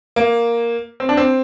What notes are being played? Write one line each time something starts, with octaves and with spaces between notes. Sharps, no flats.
A#3
C4
D4
C4